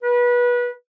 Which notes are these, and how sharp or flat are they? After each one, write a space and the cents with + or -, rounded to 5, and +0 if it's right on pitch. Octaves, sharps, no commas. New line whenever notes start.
B4 -25